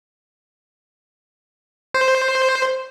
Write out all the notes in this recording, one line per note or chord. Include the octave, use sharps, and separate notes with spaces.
C5